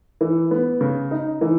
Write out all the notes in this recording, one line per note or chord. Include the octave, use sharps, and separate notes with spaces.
E3
B3
C#3
D#4
E3